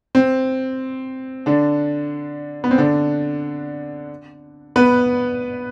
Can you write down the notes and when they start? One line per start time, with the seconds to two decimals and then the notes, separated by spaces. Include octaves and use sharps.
0.15 C4
1.46 D3 D4
2.64 B3
2.71 C4
2.78 D3 D4
4.76 B3 B4